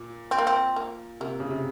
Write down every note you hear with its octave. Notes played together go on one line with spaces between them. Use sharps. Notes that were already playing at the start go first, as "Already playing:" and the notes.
Already playing: A#2
C4
A#3
C4
A#3
C3 A#3
C#3
C3